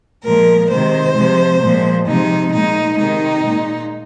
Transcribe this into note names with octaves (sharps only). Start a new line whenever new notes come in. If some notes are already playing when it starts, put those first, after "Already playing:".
A#2 F3 G#3 A#4
C3 D#3 G#3 C5
C3 F3 G#3
A#2 F3 G#3
C3 F3 G#3 D#4
A#2 G#3 D#4
C3 D#3 G#3 D#4
A#2 G#3